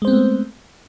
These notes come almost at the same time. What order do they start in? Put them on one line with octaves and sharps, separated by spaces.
G#3 C5 C4 B3 A3